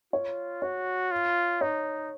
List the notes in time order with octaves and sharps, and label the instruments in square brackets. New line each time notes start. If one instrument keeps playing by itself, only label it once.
[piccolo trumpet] F4 [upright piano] C#5
[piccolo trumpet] F#4 [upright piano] C#5
[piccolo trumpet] F4
[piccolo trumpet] D#4 [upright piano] C#5